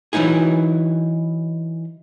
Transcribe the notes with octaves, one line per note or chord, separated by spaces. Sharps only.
E3 F#3 D#4 E4 G#4